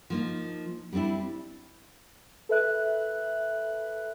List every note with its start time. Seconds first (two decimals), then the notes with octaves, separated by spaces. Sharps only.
0.10 F3 A#3 D#4
0.92 G3 B3 C4 D4 E4
2.49 A4 B4 E5 F#6